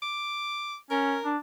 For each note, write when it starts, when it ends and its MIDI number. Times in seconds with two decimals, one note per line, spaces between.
0.02 0.76 86
0.91 1.18 61
0.91 1.31 70
1.24 1.37 62